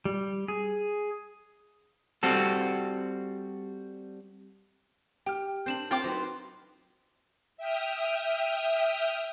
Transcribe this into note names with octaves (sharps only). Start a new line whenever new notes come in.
G3
G#4
G3 C4 F#4 A4
G4 G5 F6
C4 D4 G6 E7 F#7
C4 F4 G5 D6
F#3 D#4 B4 C5
E5 G5 D#6 F6